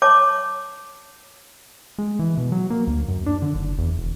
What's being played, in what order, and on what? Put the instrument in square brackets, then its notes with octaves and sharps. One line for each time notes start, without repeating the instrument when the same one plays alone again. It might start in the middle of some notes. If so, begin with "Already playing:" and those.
[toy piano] C#5 A5 D6
[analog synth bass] G#3
E3
B2
F#3
A#3
D2
F#2
D4
D3
F#1
E2
E1